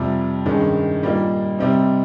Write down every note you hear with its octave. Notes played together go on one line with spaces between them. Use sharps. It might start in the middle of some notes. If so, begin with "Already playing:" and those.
Already playing: F2 C3 G3
G2 D#3 G#3 C#4
A#2 G3 A#3 D#4
C3 G3 C4 D#4